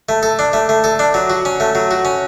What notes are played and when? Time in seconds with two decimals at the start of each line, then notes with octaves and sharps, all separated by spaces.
0.09 A3
0.23 A4
0.39 D4
0.53 A3
0.69 A3
0.84 A4
0.99 D4
1.14 F#3
1.30 F#4
1.45 C#4
1.60 A3
1.75 F#3
1.91 F#4
2.05 C#4